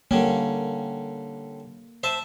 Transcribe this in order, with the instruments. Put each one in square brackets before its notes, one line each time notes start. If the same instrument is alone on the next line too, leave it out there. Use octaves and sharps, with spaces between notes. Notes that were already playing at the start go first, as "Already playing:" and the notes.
[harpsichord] D3 G3 C#4 [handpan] A#3
[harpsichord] C5 E5 A5